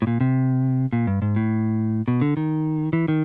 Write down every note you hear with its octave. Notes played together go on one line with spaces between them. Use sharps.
A2
A#2
C3
A#2
G2
G#2
A2
B2
D3
D#3
E3
D#3